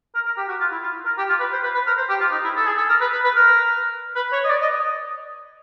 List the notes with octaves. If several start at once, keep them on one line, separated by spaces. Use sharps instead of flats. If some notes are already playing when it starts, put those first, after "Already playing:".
A#4
A#4
G4
F#4
F4
E4
F4
A#4
G4
F4
B4
C5
B4
B4
A#4
C5
G4
F4
D#4
E4
A4
G#4
A4
A#4
B4
B4
B4
A#4
B4
C#5
D#5
D5
D#5